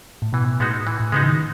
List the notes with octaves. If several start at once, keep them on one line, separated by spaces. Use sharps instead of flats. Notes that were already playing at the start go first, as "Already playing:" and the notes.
A2
B2 E3
A2 G#3 B3 D#4 F#4
E3
A2
C#3 G#3 B3 D#4 F#4
E3
D#3